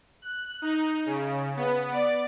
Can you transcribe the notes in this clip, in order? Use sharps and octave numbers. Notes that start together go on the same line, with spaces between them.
F#6
D#4
C#3
B3
D5